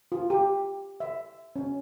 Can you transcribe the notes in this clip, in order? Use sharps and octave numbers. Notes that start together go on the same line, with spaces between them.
F4
G4
E5
C#4